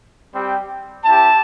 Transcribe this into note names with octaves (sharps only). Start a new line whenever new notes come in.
G3 C4 G4
C4 E4 G4 A5